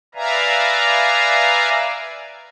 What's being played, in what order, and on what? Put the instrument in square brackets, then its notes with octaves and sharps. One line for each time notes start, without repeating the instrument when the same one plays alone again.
[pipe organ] B4 D5 E5 F5 G#5 A#5